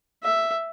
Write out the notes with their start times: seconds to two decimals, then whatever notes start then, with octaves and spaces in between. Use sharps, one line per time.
0.24 E5